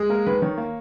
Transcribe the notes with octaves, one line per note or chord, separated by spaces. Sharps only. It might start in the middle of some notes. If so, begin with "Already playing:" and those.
Already playing: G#3
A#3 A#4
D#3 B4
D#3 C#5
A#3